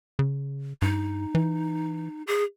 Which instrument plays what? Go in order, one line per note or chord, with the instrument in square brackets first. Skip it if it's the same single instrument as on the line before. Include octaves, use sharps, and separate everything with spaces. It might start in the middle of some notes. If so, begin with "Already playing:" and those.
[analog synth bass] C#3
[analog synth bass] G2 [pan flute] D#4
[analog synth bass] E3
[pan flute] G#4